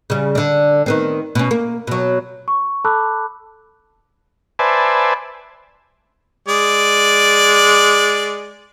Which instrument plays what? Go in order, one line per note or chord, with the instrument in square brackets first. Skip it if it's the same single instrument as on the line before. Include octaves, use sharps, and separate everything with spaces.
[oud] C#3 G3
D3 D4
D#3 B3 C4
B2 C#4
A#3
B2 F#3
[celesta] C#6
A4 A5 B5 D6 E6 F#6
[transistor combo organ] B4 C5 D5 E5 G#5 A5
[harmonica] G#3 D5